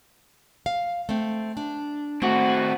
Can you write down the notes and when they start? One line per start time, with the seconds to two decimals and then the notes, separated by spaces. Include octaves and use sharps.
0.66 F5
1.09 A3 C4
1.57 D4
2.22 A3 C4 F#4